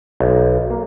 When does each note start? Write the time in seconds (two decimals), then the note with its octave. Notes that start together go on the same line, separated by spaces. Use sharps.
0.20 B1
0.70 A#3